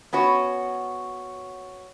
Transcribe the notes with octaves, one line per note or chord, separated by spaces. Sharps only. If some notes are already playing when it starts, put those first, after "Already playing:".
B3 C#4 F#4 C#5